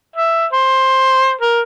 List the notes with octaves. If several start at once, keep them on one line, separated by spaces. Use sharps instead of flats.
E5
C5
A#4